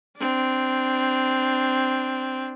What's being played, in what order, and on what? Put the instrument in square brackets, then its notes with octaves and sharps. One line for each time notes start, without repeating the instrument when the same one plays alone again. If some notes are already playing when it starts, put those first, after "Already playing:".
[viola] C4 D4